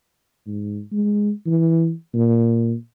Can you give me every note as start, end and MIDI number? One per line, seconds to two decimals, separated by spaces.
0.46 0.80 44
0.92 1.31 56
1.46 1.92 52
2.14 2.75 46